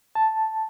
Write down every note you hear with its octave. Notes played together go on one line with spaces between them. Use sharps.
A5